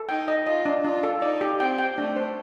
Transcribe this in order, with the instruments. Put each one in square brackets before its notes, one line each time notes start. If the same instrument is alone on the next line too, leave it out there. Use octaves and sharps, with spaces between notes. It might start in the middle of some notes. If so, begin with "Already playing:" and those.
Already playing: [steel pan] A4
[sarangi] D#4 [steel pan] G5
[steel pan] D#5
[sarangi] F4 [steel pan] D#5
[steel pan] D4
[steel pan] D4 [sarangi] F4
[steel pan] A4
[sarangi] D#4 [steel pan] D5
[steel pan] G4
[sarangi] C4 [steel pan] G5
[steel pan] G5
[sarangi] A3 [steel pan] D4
[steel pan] C5